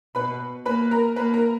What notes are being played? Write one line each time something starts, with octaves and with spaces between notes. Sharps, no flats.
B2 B4 B5
A#3 B4 B5
A#4 A#5
A#3 B4 B5
A#4 A#5